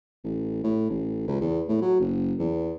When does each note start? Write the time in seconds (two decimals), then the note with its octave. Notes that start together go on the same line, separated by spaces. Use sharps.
0.24 A1
0.64 A2
0.90 A1
1.28 C#2
1.40 E2
1.68 A2
1.82 F#3
2.00 F#1
2.39 E2